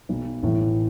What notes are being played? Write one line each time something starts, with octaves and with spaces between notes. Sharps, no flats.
B1 B2
A1 A2 E3